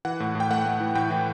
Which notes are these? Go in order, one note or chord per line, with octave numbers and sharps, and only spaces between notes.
E3 F#5
A2
A2
G5
A3 F#5
A3
E3
A2 G5
E3